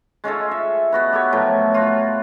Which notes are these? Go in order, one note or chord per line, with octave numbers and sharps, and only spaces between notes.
G#3 C#4 F4 A4
E5
B3 F#4 B4
G4 A4 C#5
A2 F3 F#3
F4 F#4